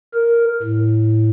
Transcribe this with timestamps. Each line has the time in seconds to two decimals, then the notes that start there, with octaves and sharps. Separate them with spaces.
0.14 A#4
0.62 A2